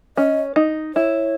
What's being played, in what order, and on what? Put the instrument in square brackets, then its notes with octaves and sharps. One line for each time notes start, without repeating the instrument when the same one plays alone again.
[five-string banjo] C#4 [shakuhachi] D#5
[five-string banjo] D#4
[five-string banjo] E4 [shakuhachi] C#5